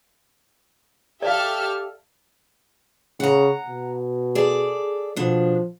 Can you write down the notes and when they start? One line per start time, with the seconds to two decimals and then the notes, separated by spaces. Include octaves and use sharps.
1.22 G4 A4 D5 E5 F5 F6
3.20 C#3 F#5 A#5
3.67 B2
4.35 G#4 A4 D5
5.16 B2 F3 D4